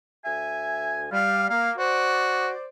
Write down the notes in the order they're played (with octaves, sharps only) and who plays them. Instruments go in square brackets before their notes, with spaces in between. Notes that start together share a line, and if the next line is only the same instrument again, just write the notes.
[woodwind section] D2 E5 G#5
[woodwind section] G3 [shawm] F5
[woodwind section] A#3 [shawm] F5
[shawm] F#4 [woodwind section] C5 D5